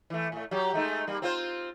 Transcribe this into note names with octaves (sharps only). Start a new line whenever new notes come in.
E3 A3
A2 A3
F#3 G4
G#3 A3 D#4
G3 A#3
C4 F4 C5